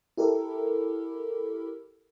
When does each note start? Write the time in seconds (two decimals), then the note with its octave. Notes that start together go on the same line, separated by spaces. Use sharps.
0.17 E4 G4 A4 A#4